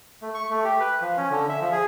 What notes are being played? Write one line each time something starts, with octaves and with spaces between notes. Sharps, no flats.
A3
C#6
A3
G4
B4
F3
C#4
D3
E5
F3
G#4